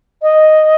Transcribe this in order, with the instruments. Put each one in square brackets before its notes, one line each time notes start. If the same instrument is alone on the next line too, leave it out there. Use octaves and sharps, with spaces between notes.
[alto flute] D#5